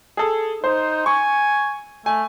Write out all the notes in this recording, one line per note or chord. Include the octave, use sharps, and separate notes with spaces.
G#4 A4
D#4 C5
G#5 C#6
A3 G#5